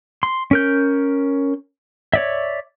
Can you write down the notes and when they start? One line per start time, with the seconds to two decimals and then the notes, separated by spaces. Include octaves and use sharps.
0.23 C6
0.51 C#4 A#4 G6
2.14 C#5 D5 E5